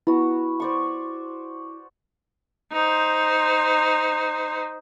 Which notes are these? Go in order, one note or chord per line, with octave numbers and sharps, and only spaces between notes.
B3 E4 F#4
C5 D5 C#6
D#4 C5